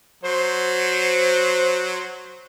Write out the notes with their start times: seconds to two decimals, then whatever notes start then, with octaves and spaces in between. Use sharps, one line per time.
0.23 F#3 C5